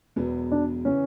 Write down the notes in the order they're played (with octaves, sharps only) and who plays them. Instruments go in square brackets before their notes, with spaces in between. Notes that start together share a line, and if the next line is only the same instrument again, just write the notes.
[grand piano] E1 E2 B2 F#3 B3
[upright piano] D4
[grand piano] C#3 E3 [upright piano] C#4